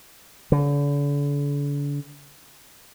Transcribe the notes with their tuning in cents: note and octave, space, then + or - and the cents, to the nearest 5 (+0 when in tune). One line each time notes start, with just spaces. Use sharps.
D3 -40